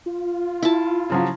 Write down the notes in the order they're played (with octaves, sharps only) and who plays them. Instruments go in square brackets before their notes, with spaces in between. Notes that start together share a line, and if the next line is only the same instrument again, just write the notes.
[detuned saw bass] F4
[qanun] E4 A5
[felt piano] C#3 F3 F#3